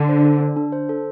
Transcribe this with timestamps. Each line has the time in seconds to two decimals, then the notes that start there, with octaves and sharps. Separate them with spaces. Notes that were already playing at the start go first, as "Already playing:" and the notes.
Already playing: D3 D4
0.09 C5
0.25 A4
0.40 D4
0.56 D4
0.72 C5
0.89 A4